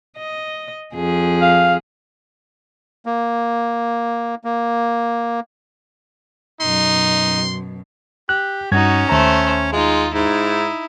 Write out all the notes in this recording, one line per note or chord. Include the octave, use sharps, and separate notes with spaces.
D#5
F2 G#4
F5
A#3
A#3
F#2 B2 D#4 C6
G4 F#6
G2 C#4 D#4 F#4 G#6
D#2 A3 C5 A#5
G#3 D#4 F4
G#2 D#4 E4